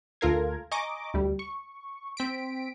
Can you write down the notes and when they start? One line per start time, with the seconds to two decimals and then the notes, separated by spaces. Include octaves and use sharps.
0.21 D2 F4 A4 A#4 F5 G#6
0.71 D#5 G#5 A#5 C#6 D6
1.14 D2 G3
1.39 C#6
2.17 C4 B6 D7